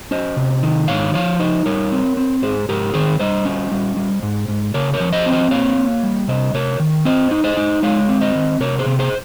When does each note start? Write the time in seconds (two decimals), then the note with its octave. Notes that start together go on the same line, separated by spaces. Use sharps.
0.11 C#4 C5 D#5
0.36 C3
0.63 D#3
0.88 G#2 C#5 F5
1.14 F3 C#5 F5
1.39 D#4 C5 D#5
1.66 G3 A#4 C#5
1.92 C4
2.17 C4
2.42 G#2 G#4 C5
2.69 G#2 G4 A#4
2.94 D#3 G#4 C5
3.19 G3 C5 D#5
3.45 C#4
3.71 G3
3.97 G3
4.23 G#2
4.48 G#2
4.74 C#3 A#4 C#5
4.93 A#4 C#5
5.00 F3
5.13 C5 D#5
5.26 C4
5.32 C5 D#5
5.51 A#3 C#5 F5
5.78 A#3
6.03 G3
6.28 C3 C5 D#5
6.54 C3 A#4 C#5
6.80 D#3
7.05 C4 C5 D#5
7.31 D#4
7.44 C5 D#5
7.57 D#4
7.82 G#3 C#5 F5
8.09 C4
8.21 C5 D#5
8.35 D#3
8.60 C3 A#4 C#5
8.79 G#4 C5
8.86 C3
8.99 G#4 C5